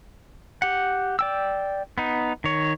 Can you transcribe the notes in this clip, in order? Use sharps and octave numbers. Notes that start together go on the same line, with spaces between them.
G4 F#5
D5 G5 E6
B3 D#4
D#3 C#5